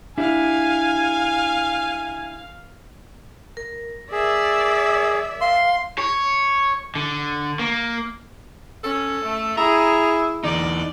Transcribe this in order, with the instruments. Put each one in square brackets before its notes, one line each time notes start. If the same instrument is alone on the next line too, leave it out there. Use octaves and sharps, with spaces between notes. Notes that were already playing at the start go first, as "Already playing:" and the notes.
[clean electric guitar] D4 E4 G4 [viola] F5 [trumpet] G#5
[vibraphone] A#4
[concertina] G#4 [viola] D5 E5
[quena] F5 [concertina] C6
[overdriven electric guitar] C#5
D3
A#3
[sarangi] C#4 [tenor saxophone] A4
[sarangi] A3
[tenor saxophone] E4 [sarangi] G#4 [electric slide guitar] A#5
[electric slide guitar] E2 D#4 [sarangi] D5